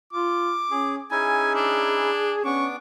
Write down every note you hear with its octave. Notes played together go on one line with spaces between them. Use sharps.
F4 D6
C#4 G#4
C#4 D#4 E4 G#4 G#5
D4
B3 C#4 D4 C#6 D6